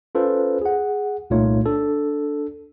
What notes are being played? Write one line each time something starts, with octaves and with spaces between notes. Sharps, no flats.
C#4 F4 A4 B4 C5
G#4 F#5
C2 A#2 A3 D#4 F4 C#5
D4 A4